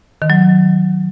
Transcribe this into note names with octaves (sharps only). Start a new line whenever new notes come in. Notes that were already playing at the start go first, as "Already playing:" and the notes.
D#3
F#3